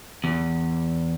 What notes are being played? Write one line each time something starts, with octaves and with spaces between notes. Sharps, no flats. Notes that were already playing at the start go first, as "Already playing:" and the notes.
E2